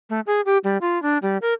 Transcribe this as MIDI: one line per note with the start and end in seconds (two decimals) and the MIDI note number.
0.10 0.20 57
0.27 0.41 68
0.45 0.58 67
0.64 0.77 55
0.81 1.01 65
1.02 1.18 62
1.22 1.37 55
1.42 1.53 70